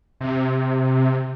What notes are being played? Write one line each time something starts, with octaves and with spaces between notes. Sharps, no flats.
C3